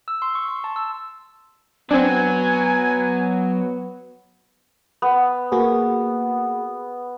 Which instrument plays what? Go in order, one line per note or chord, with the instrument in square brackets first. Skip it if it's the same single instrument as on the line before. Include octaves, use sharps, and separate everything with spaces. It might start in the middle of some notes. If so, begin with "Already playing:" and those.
[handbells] E6
C6
C#6
C6
A5
E6
[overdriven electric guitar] F#3 [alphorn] B3 [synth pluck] C4 D4 [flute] G#5
[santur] B3
[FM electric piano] A#3 F#4 G#4